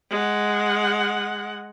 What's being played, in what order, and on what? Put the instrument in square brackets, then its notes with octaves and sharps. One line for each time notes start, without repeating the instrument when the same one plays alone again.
[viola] G#3 F#5